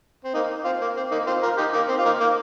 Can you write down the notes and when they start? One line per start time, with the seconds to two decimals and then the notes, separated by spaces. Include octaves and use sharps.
0.24 C4
0.34 A#3 D#4
0.64 C4 F4
0.81 A#3
0.96 C4
1.11 A#3 D#4
1.27 C4 F4
1.43 F4 A#4
1.58 D#4 G4
1.73 A#3 D#4
1.89 C4
1.99 F4
2.05 A#3 D#4
2.20 A#3